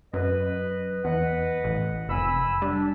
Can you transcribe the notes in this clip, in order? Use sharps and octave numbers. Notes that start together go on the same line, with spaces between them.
F#2 B4 D#5
E2 B4 D#5 F#5
A1
F1 G#5 B5 E6
G3 D4